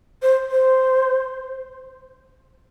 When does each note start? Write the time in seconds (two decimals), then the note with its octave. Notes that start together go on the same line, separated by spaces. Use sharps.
0.22 C5
0.51 C5